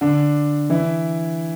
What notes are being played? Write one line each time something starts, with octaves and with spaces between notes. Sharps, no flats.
D3 D4
E3 E4